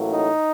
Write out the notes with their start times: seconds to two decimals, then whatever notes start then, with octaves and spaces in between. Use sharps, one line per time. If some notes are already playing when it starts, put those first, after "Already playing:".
Already playing: A1 A2 F#3 A#3
0.11 D#4